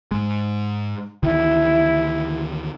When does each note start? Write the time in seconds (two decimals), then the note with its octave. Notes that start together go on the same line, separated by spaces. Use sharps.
0.11 G#2 G#3
1.23 D2 D#3 E3 E4